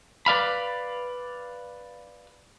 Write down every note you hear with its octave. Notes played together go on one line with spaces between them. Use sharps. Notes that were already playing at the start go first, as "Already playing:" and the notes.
B4 D5 F5 B5